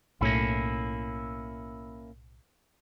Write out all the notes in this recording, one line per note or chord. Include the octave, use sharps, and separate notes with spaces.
B1 A2 A#3 C#4 E4